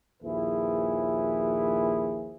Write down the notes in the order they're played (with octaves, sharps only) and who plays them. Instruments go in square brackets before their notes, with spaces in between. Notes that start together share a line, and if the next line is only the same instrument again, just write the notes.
[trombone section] A#1 D#2 F3 E4 G#4 B4